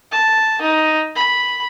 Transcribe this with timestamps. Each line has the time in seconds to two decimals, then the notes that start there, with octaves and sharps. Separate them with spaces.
0.11 A5
0.62 D#4
1.16 B5